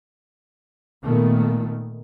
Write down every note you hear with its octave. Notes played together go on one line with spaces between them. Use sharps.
A#2 D#3 A3 B3